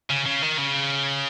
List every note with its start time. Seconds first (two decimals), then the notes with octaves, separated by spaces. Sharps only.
0.10 C#3
0.26 C#3
0.42 D#3
0.58 C#3